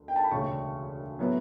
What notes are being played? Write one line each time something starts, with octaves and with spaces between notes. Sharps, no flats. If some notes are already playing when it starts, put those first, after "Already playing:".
Already playing: D2
G5
A5
B5
E1 D2 C#3 C#6
A2 F#3 B3 E4